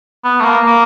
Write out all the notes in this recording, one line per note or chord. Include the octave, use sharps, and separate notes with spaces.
B3
A3
A#3
A#3